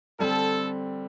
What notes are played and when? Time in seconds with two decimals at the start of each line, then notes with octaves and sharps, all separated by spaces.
0.19 D3 G3 C4 A4